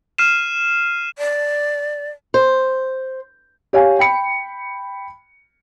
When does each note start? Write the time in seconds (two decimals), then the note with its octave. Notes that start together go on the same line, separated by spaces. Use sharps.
0.18 F6 C7 D#7 E7
1.18 D5
2.34 C5
3.73 G4 C#5 F5 G#5
3.99 G5 B5 C#7